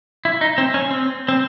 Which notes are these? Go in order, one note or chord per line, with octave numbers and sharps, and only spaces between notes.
E4
D#4
C4
C#4
C4
C4